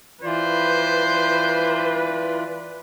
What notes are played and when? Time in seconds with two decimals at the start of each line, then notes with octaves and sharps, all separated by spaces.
0.24 E3 F4 B4 C5 D5